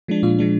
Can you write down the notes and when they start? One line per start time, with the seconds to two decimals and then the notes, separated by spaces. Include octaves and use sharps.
0.08 F3 G#3 D4
0.23 A#2 F4
0.39 F3 G#3 D4